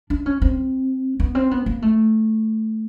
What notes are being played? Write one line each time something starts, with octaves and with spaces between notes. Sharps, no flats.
D4
C#4
C4
B3
C4
B3
A#3
A3